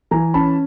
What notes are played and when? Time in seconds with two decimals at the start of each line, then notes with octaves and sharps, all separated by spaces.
0.11 E3 G#5 A#5
0.34 C#4 A5 B5